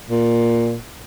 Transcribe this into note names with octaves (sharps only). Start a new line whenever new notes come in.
A#2